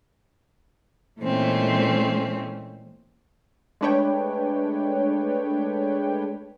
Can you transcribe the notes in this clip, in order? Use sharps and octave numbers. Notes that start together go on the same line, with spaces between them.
A#2 E3 G#3 A3 C4 C#4
G#3 A3 D4 B4 C#5 G5